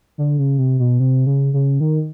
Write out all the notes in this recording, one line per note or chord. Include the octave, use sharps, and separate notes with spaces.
D3
C#3
C3
B2
C3
C#3
C#3
D#3